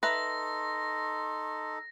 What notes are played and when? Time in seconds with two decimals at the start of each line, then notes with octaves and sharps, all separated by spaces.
0.03 D#4 A4 B4 E5 A#5 C6 A#6